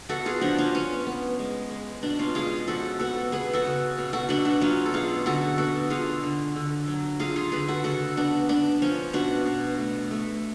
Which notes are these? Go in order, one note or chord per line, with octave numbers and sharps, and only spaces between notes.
B3 F#4 A4
F4 G#4
F3 D4 F#4
C#4 F4
B3 C#4
B3
G#3
G#3
B2 D4
C#4 F4
G#3 F4 G#4
F3 F#4 A4
B3 F#4 A4
B3 G#4 B4
F#4 A4
C#3
B2
F#4 A4
B3 D4 F#4
D4 F#4
F#3 C#4 F4
A4
B2 F4 G#4
D3 F#4 A4
B3 F#4 A4
D3 F4 G#4
D3
D3
F#3
D3 F4 G#4
F4 G#4
D3 G#4 B4
F#4 A4
C#3 F#4 A4
B3 D4 F#4
B3 D4
F3 C#4
B2 D4 F#4
B2
A3
A3